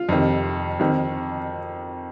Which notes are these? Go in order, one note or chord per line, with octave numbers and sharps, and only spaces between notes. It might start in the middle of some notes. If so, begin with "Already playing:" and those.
Already playing: F4
F2 C3 D#3
F2 D#3